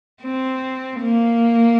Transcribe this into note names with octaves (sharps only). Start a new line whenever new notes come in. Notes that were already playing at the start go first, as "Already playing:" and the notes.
C4
A#3